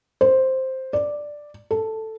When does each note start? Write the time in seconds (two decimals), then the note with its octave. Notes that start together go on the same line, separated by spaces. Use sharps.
0.21 C5
0.93 D5
1.71 A4